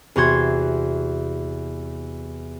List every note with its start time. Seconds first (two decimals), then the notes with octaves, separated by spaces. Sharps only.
0.16 E2 C3 F#4 C6 G#6